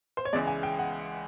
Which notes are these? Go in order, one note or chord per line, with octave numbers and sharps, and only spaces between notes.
C5
C#5
C#2 C#3 E3 G#3 D5
G#5
G5
F#5